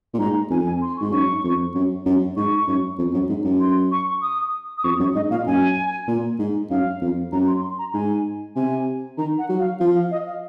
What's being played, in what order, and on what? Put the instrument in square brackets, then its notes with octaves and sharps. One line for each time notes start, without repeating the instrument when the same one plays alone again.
[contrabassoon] A#2
[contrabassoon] G#2 [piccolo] A#5
[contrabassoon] F2 [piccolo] G#5
[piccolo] G#5
C6
C#6
[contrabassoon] G#2
[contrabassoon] F#2 [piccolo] C#6
[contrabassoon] F2
F#2
F#2
[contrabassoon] G#2 [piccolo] C#6
[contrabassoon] F#2
F2
F#2
G#2
F#2
[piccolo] C6
C#6
D#6
D#6
[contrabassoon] F2 [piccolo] C#6
[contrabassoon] F#2
[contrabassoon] G#2 [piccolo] D#5
[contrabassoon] A#2 [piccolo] F5
[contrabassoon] F#2 [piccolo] G#5
[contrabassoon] A#2
G#2
[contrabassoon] F#2 [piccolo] F5
[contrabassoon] F2
[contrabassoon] F#2 [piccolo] A#5
[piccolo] C6
C6
A#5
[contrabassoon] G#2 [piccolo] G#5
[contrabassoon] C3 [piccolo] G#5
[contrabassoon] D#3 [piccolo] A#5
[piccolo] F#5
[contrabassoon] F#3
[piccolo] F5
[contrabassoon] F3 [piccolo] F5
[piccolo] F5
D#5
F5